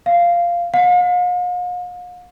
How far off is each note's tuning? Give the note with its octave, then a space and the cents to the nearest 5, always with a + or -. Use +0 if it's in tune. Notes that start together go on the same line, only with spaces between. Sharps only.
F5 -10
F5 +45